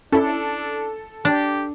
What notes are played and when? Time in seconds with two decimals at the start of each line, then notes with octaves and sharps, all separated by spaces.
0.12 C#4 D4 E4 A4
1.25 D4 G4